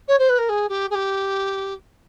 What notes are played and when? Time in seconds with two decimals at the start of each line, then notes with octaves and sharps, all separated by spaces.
0.08 C#5
0.19 C5
0.29 B4
0.38 A#4
0.49 G#4
0.69 G4
0.90 G#4
0.95 G4